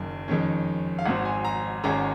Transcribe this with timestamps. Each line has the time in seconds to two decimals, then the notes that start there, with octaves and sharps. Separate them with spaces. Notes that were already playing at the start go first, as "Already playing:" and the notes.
Already playing: F#1 F#2 D#3
0.28 F2 D#3 G#3 C#4
0.99 F5
1.05 G#1 G#2 F#3 C4 F#5
1.25 G#5
1.45 A#5
1.84 G#1 G#2 D#3 G#3 C#4 A#5